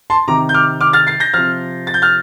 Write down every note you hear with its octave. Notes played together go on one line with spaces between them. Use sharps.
A5 C6
C3 D#3 A#5 D6
G6
D6 F6
D6 F6
F6 A6
A6 C7
G6 A#6
C3 F3 F6 A6
A6
G6
F6 A6